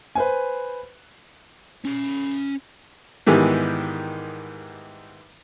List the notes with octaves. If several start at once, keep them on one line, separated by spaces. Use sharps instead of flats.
B4 C5 G#5
C#4 B5
G#2 D#3 E3 G3 B3